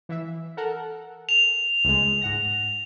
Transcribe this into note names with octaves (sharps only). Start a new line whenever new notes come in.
E3 E5
A4 A#4 F#5
F7
C#2 G#3
G#2 F#5 A#6